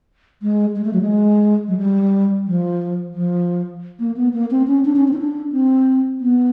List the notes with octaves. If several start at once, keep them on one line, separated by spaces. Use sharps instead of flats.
G#3
G#3
A3
F#3
G#3
F#3
G3
F3
F3
A#3
B3
A#3
C4
C#4
D4
C#4
C4
D#4
D4
C4
B3